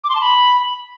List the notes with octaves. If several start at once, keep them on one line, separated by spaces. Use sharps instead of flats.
D6
C6
A5
B5